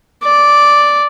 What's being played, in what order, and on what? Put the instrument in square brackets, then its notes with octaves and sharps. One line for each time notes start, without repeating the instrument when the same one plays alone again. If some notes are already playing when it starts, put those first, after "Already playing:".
[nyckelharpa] D5